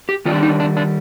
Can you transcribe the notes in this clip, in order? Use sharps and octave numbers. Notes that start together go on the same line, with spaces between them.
G4
D#3 G3 D4 F4
D#4
D4
D4